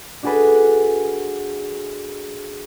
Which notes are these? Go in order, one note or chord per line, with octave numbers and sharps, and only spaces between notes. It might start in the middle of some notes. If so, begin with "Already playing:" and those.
D4 F#4 G#4 A4 B4